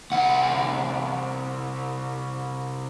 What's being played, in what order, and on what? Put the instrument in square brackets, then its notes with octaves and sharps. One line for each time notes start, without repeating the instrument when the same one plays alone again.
[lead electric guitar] C2 F#5